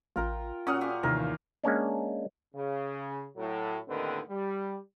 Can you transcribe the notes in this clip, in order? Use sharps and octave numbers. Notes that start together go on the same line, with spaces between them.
A1 F4 A#4 G5
A#2 F#3 C#4 F#5 C#6 D#6 F6
G4 G#4 F5
A1 D#2 C3 A#4
G#3 A#3 C#4 D4
C#3
A2 F#3
D#2 A2 D3 D#3 C4 B4
G3